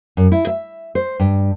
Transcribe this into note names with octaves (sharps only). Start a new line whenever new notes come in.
F#2
E4
E5
C5
G2